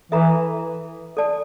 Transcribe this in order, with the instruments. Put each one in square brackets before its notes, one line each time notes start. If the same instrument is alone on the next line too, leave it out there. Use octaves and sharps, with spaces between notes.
[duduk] E3 [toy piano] A4 E5 A#5
[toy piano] A4 D5 A5